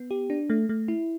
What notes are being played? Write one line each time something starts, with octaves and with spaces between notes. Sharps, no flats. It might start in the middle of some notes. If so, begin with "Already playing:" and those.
Already playing: B3
G4
D4
A3
A3
E4